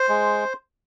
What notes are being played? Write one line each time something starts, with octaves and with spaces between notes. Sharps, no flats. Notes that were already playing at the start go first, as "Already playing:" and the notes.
Already playing: C5
G#3